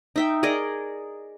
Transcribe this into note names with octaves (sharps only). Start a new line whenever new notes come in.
D#4 E5 G5
G#4 A#4 D5 D#5